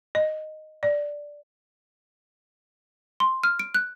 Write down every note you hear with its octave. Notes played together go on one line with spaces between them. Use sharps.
D#5
D5
C6
F6
D7
F#6